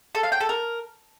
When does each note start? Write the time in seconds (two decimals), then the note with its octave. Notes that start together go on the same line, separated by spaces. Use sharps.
0.15 A4
0.23 F5
0.32 G5
0.40 A4
0.49 A#4